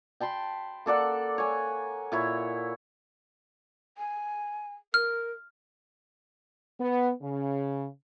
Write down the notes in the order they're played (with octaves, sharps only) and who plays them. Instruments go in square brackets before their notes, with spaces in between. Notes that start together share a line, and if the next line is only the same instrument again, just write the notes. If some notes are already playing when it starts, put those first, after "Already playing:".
[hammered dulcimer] G5 A5 B5 C6
A#3 A4 D5 F#5
C#5 G#5
A#2 E4 C#5
[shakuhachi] G#5
[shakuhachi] A#4 [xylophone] F6
[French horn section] B3
C#3